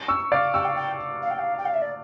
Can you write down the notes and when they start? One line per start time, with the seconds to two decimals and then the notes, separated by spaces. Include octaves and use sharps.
0.08 C#6 E6
0.32 D5 F5
0.54 G5 C#6 E6
0.65 F5
0.76 G5
1.22 F5
1.31 G5
1.39 F5
1.58 G5
1.66 F5
1.74 E5
1.82 D5